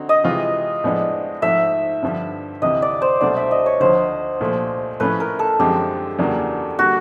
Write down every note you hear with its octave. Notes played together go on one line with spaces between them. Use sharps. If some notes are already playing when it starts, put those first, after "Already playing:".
Already playing: D3 C4 D#4 F#4
D#5
C3 E3 G#3 C4 F4
A2 F3 G#3 B3 D4
G#2 F3 A3 E5
G2 D3 F3
D2 C3 E3 D#5
D5
C5
C2 B2 F#3 A3 D4 D5
E5
D#5
C#5
D2 D3 F3 C5
C2 A#2 F3 A3
A2 F3 A3 C#4 B4
A#4
A4
F#2 D3 F3 G#3 C4 G4
E2 C#3 F#3 A#3 D4
D3 G3 A#3 F#4